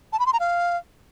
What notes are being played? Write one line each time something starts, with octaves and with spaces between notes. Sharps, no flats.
A5
B5
C6
A#5
F5